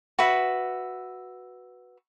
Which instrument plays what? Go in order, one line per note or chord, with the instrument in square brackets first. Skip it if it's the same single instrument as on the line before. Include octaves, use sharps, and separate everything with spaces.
[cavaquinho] F#4 B4 E5